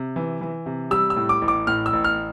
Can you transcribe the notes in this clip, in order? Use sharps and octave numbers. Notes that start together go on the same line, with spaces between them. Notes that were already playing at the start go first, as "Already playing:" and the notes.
Already playing: C3
E3
E3
C3
G3 E6
E6
A2
D6
A1
D6
A2 F6
E6
A1
F6